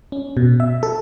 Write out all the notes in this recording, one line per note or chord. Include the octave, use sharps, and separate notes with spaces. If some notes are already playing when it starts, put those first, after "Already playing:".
C#4
B2
E5
A4